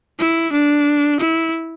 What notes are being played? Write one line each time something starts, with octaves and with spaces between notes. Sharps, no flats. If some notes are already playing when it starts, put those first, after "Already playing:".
E4
D4
E4